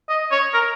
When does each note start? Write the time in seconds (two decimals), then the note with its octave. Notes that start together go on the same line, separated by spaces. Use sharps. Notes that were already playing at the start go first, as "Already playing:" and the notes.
0.09 D#5
0.31 C#5
0.54 A#4